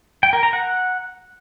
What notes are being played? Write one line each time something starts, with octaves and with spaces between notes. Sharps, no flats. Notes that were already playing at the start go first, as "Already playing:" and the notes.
G5
A#4
A#5
F#5